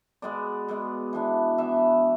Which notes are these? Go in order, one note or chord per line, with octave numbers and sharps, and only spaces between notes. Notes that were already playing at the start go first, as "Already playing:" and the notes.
B2 G#3 B3 D5
B2 G#3 B3
E3 B3 D4
E3 B3 D4 E5